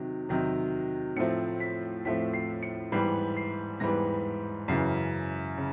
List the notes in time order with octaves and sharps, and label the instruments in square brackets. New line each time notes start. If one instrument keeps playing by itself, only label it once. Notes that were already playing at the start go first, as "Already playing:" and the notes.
Already playing: [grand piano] C3 D#3 F#3
C3 D#3 F#3
A2 F3 A3 C4 C#7
B6
A2 F3 A3 C4 B6
C7
C#7
G#2 E3 G3 B3 C7
C7
G#2 E3 G3 B3 A#6
F#2 C#3 E3 C7
C#3